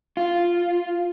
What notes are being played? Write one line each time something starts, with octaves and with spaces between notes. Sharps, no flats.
F4